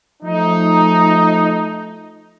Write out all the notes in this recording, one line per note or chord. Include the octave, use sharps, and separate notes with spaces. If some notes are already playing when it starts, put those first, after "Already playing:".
F3 A3 D#4